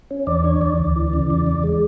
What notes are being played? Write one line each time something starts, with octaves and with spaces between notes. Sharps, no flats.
C#4
E2 D5
D4 C#5
E2 D5
D2
E3
C#3
E2
E2
G#3